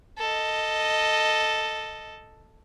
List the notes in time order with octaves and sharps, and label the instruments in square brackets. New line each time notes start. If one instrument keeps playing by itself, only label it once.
[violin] A4 D#5